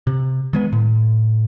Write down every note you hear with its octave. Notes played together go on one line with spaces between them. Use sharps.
C3
D#3 G#3 B3
A2